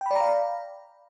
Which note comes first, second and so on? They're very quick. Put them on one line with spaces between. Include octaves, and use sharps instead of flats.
G5 B5 D5 A#5 F5